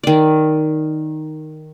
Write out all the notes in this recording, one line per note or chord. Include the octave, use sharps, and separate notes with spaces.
D#3 D5